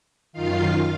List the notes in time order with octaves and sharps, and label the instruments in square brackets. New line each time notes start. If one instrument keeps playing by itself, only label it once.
[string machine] F#2 D#3 F4 F5